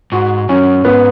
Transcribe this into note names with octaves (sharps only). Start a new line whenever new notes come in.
G#2 F#4
F#2 C#4
G#2 B3